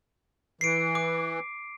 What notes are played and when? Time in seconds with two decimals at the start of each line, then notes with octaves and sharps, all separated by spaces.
0.61 E3 C7 D7
0.95 D6